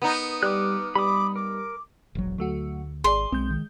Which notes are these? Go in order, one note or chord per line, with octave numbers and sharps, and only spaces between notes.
B3 D#4
G3 D6 F6 F#6
G3 B5 D6 D#6
A#4 D6
E1 A#1 F#3
D2 F#3 A3 F#4
G#1 G#4 D5 C6
B1 G#3 C4 G6
D#3